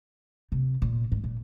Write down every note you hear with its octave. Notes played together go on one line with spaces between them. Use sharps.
C3
A#2
G#2
A#2